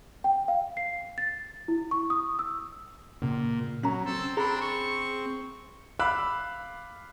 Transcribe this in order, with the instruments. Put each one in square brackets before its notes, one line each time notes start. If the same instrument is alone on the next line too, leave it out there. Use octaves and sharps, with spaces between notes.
[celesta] G5
F5
C7
A6
E4
C#6
D#6
E6
[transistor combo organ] A#2 [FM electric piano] C#3
[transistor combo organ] F#3 [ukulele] C#4 A#5
[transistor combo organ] C4 [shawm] A4
[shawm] D4 [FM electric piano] G#4 [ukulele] A#5 B5
[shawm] C#6
[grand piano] F5 B5 D6 E6 F#6